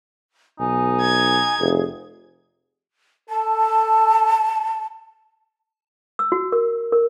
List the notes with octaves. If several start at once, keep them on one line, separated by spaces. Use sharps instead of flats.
B1 D#4 G#5
G#6
F1 G#4
A4 A5
E6
F#4
A#4
A#4